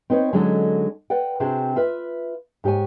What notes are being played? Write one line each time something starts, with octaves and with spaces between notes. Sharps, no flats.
C4 D#4 B4 C#5
D3 F#3 G#3 C#4 D#4 A4
B4 D5 F#5 G5
C3 C4 D4 F#4 G#4
F4 B4 E5
G#2 G4 C#5 G#5